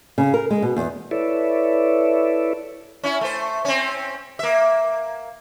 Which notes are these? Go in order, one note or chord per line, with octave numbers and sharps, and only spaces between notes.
C#3
A#4
G#3
B2
E2
E4 A4 B4 C#5 D5 E5
C#4 E4
A3 C5
C4 C#4
A#3 E5